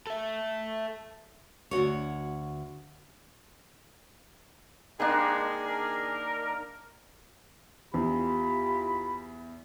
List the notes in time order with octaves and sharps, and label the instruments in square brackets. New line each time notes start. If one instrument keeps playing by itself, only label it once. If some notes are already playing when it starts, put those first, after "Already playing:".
[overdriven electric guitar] A4 E5
[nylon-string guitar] D2 A#2 F#4 C#5
[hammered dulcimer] D#3 A#3 D4 [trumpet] G#3 [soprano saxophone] G#4
[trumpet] A#4
[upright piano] E2 [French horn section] E4 F4 G4 [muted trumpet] B5